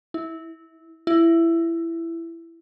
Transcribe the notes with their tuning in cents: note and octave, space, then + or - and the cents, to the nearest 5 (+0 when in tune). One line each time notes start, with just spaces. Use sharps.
E4 -20
E4 +15